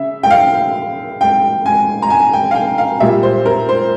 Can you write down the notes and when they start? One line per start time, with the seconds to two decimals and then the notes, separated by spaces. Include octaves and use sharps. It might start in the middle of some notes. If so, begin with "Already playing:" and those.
Already playing: C#3 E5
0.23 G5
0.30 F5
1.21 G5
1.66 G#5
2.02 A#5
2.10 G#5
2.33 G5
2.51 F5
2.55 G5
2.78 F5
3.00 A#2 G3 E5
3.23 C5
3.46 A#4
3.69 C5